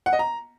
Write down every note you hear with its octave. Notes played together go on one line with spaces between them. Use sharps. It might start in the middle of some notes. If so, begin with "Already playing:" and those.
F#5
D#5
A#5